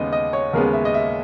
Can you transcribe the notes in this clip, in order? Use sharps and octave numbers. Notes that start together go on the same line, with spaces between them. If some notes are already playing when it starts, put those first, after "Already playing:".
Already playing: D#2 C#3 G#3 B3 D#5
D#5
C#5
D#2 C#3 G#3 B3 A#4
E5
D#5
E5